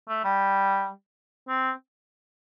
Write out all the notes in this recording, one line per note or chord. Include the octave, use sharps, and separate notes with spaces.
A3
G3
C4